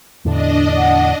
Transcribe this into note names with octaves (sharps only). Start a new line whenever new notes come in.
E2 A2 D3 D4 D#5
F#5